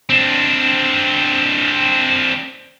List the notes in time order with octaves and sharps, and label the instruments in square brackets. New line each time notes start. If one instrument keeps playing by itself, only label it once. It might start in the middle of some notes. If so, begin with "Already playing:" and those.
[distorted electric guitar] C4 D4